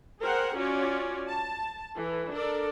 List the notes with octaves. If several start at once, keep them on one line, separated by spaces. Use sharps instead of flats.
G#4 A#4 C5 F#5 G5
C#4 F4 F#4 C#5 D5
A5
E3 A4
D4 A4 A#4 D5